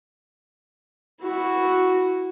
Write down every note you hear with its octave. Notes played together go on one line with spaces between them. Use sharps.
E4 F#4